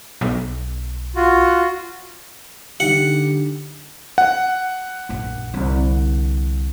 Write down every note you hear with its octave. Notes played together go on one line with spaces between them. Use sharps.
B1
F4 F#4
D3 D#4 G4 F#5
F#5
A#1 F#2
C2 D3